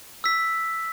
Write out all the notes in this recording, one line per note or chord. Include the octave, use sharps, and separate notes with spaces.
E6 B6